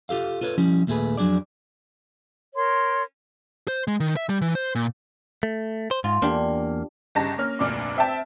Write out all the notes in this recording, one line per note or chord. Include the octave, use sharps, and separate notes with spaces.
F4 G4 A4 F5
F4 A4 B4 C#5
F3 G3 C#4 E4
D#2 A#2 A3 D#4 G#4 B4
F2 F#3 D4 G#4 D5
A#4 C#5 C6
C5
G#3
D#3
E5
G3
E3
C5
A#2
A3
C5
G#2 F4
E2 A#3 D4 G4
G1 C#3 D#4 G4 A5 A#6
A#3 C#4 F6
F1 D2 A#2 D4 D6
C4 E5 G5 A5